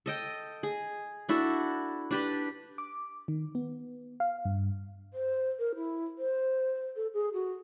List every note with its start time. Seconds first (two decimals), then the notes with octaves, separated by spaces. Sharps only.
0.06 A4 D#5 G5
0.63 G#4
1.29 D4 E4 F#4 A4
2.11 D4 G4 B4
2.78 D6
3.28 D#3
3.55 B3
4.20 F5
4.45 G2
5.14 C5
5.59 A#4
5.76 E4
6.18 C5
6.96 A4
7.14 G#4
7.34 F#4